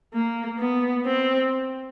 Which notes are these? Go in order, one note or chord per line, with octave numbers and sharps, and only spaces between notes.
A#3
B3
C4